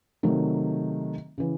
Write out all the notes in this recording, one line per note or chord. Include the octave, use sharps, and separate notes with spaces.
C3 D#3 F#3 A3
C#3 E3